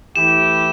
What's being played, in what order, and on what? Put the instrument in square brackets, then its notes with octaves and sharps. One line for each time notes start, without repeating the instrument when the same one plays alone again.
[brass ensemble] E3 A3 E4 G4 [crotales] E7